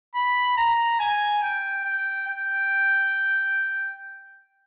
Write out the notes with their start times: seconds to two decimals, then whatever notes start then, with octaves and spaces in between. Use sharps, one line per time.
0.15 B5
0.57 A#5
1.00 G#5
1.42 G5
1.85 G5
2.27 G5